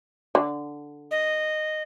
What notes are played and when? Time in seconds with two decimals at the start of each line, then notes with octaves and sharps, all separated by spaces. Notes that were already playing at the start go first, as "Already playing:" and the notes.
0.35 D3
1.11 D#5